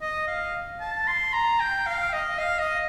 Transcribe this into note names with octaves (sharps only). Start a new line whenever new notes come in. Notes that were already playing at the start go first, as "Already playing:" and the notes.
D#5
F5
A5
C6
A#5
G5
F5
D#5
F5
D#5